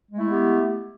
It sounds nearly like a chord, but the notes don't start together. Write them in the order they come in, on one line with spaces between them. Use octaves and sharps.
G#3 A3 E4 B3 G4